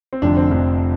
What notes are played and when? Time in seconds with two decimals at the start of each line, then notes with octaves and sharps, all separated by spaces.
0.13 C4
0.22 F1 F2 D3 D4
0.37 C4
0.51 F1 F2 D3 D4